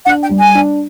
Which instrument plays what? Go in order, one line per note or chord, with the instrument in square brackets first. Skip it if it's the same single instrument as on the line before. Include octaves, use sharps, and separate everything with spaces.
[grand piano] D4 [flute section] F#5
[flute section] G5
[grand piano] G3
[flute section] G#5
[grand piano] D4